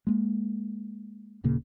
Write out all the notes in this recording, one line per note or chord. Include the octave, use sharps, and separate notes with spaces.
G#3 A#3
D#1 A#2 C#3 A#3